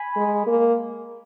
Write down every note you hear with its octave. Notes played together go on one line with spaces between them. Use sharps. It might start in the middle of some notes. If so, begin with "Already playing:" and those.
Already playing: G#5 B5
G#3
A#3